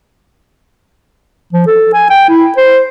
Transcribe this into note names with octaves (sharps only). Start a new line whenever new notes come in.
F3
A4
G#5
G5
E4
C5